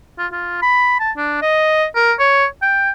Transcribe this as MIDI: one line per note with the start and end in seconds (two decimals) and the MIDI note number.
0.18 0.27 65
0.32 0.58 65
0.62 0.99 83
1.00 1.11 81
1.17 1.40 62
1.42 1.85 75
1.95 2.13 70
2.20 2.45 73
2.62 2.91 79